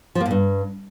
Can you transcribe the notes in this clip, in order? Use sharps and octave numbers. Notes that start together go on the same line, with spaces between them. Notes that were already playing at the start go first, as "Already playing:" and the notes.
F3
A#3
A2
G2